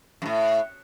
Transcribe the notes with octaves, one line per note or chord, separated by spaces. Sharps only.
F#2 A2